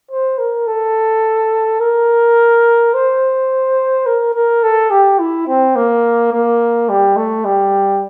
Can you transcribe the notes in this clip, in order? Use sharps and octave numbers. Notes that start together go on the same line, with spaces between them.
C5
A#4
A4
A#4
C5
A#4
A#4
A4
G4
E4
C4
A#3
A#3
G3
A3
G3